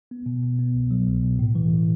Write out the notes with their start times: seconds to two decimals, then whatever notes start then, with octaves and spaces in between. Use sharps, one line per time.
0.11 B3
0.26 B2
0.43 B2
0.59 B3
0.75 C2
0.91 F#3
1.06 C2
1.23 B2
1.39 A2
1.55 E3